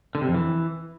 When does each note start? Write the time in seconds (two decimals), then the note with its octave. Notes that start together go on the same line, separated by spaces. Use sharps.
0.15 D3
0.21 C3
0.28 F2
0.34 E3